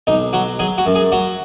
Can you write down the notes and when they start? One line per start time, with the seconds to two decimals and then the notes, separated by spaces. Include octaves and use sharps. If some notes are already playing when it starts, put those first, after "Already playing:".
0.07 B1 D#4
0.33 F#3 F#4
0.59 F#3 G#4
0.78 F#4
0.86 F#2
0.95 G#4
1.12 F#3 F#4